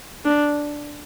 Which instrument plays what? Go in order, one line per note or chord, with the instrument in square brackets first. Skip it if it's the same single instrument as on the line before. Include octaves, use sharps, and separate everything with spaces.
[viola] D4